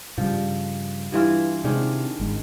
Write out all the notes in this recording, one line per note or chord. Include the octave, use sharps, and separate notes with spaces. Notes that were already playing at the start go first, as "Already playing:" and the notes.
G2 C#3 F3 G3
G2 E3 F4
C3 D#3 G#3 D4
G#1 G#3